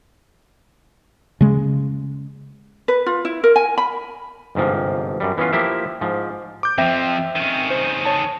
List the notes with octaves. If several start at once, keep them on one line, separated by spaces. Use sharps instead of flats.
C#3 G#3
B4
F4
E4
A#4
G#5
B5
G1 G#2 C3 F3
F#2 G3
E3 B3 C#4 F4
F3 A#3 E4 G4 E5
G#2 F3
D6 G6
F2 F3 C4 E5 G5
D#3 C#4
C5
C#5 A5